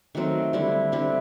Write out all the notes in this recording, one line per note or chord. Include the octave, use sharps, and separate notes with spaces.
D#3 F#3 A3 C4
D3 G3 C4 E4
D3 G3 C4 E4